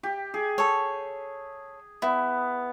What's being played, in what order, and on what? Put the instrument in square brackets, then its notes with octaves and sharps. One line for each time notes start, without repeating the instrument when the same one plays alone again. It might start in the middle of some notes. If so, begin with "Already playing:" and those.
[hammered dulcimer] G4
G#4
[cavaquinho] A4 C#5
[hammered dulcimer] B3 [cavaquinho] E4